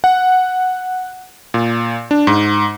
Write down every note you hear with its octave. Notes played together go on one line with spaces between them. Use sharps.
F#5
A#2
D4
G#2